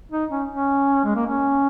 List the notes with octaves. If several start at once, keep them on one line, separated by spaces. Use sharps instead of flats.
D#4
C#4
C#4
G#3
A#3
C#4